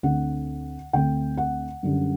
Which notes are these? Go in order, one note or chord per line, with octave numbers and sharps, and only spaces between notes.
D2 D3 A3 C4 F#5
D2 D3 A3 C4 G5
F#5
F#2 D3 G3